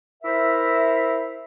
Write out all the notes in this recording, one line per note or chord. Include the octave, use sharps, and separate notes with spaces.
E4 A#4 C5 E5